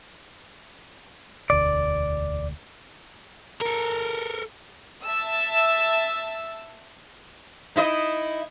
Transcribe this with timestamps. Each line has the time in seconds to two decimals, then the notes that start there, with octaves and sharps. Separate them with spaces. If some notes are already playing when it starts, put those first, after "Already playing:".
1.50 E1 D2 D5
3.61 A4 A#4
5.05 E5 A5 E6
7.76 D#4 E4 D#5